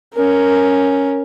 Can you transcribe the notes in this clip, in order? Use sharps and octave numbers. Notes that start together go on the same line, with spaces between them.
C#4 A#4